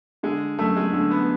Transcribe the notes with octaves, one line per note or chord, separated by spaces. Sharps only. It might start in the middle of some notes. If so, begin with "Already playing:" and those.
D3 G#3
F#2 A3
G#3
D3 A3
B3